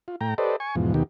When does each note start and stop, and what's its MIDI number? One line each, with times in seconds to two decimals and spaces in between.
0.08 0.16 65
0.21 0.34 45
0.21 0.34 79
0.21 0.34 82
0.38 0.56 67
0.38 0.56 69
0.38 0.56 71
0.38 0.56 72
0.38 0.56 74
0.38 0.56 75
0.60 0.75 80
0.60 0.75 85
0.76 0.93 40
0.76 0.93 44
0.76 0.93 47
0.76 0.93 53
0.94 1.03 39
0.94 1.03 47
0.94 1.03 51
0.94 1.03 67